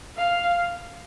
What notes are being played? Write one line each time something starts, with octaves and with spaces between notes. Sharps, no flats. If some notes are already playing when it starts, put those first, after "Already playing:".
F5